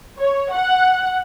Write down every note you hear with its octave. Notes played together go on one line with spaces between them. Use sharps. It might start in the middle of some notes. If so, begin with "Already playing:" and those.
C#5
F#5